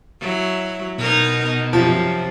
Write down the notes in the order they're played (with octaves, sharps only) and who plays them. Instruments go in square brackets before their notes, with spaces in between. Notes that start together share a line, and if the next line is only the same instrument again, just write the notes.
[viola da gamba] F#3 E4
[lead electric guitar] B2 [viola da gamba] D#4 A#4
[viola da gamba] F#2 C3 [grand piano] F3